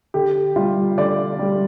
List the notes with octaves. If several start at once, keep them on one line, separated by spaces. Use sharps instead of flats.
D3 G4
G3 F4
D3 D5
G3